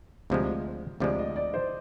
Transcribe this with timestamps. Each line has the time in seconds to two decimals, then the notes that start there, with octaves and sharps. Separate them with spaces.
0.30 D2 C3 F3 G#3
1.00 D2 C3 F3 G#3 D5
1.19 D#5
1.36 D5
1.54 C5